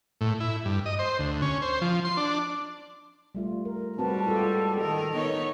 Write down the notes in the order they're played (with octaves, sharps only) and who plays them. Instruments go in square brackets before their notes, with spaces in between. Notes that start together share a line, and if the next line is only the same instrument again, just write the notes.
[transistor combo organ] A2
E4
G2
D#5
C5
D2
C#4
C5
F3
C6
D4
[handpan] G3 A3 F4
A#4
[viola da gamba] G#2 G3 [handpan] C4 F#4 B4 [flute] A5
[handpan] F4 G4 [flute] A4
[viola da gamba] D#3 A#4 [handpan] D#5
[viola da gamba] B3 D#4 C#5